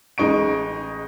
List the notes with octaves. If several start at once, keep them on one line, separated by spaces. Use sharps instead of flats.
A1 G#3 D#4 C#6 D7